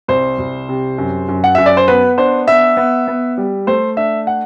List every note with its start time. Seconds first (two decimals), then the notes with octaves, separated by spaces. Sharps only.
0.08 C2 C5
0.38 C2
0.69 C3
0.98 F#2
1.29 F#2
1.44 F#5
1.55 F#2 E5
1.66 D5
1.77 C5
1.88 B3 B4
2.18 D4 C5
2.47 B3 E5
2.77 B3
3.08 B3
3.38 G3
3.67 A3 C5
3.97 D4 E5
4.27 F#5